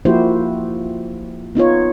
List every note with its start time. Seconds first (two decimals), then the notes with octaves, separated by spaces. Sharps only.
0.05 F3 A#3 E4 F#4 G4 C5
1.55 B3 D#4 F4 C#5